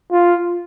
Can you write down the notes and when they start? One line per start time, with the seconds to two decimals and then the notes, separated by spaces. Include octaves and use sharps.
0.12 F4